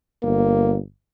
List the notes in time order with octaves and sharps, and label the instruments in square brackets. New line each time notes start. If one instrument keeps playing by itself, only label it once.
[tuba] G1 [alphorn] A#3